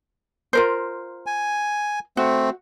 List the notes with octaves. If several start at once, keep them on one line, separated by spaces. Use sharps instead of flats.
F4 A#4 C5
G#5
A3 C4 F#4